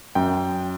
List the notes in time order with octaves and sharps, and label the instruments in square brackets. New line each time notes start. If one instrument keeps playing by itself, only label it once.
[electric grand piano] F#2 G5